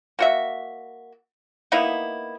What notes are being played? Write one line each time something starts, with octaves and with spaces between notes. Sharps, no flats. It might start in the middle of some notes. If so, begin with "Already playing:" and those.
A#3 F#4 E5
A#3 B3 D#4 E4